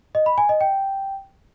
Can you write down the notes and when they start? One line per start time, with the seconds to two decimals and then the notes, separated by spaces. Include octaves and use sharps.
0.15 D#5
0.26 B5
0.38 G#5
0.49 D#5
0.61 G5